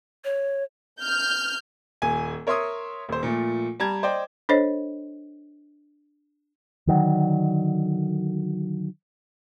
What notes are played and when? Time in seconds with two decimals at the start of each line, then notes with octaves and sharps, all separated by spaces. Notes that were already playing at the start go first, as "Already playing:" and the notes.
0.25 C#5
1.00 F6 G6
2.02 D#1 G#5
2.47 A#4 C#5 E5 C6 C#6 D#6
3.09 D#1 C5
3.23 A#2 F3 A3
3.80 G3 A5 A#5 G#6
4.03 C5 D5 D#5 G5
4.49 D4 A4 C5 C#5 D#5
6.87 D3 D#3 F#3